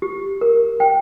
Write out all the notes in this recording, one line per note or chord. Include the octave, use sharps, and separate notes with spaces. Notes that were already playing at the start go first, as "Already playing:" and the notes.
G4
A#4
G5